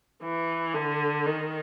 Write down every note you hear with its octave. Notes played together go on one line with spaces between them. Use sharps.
E3
D3
D#3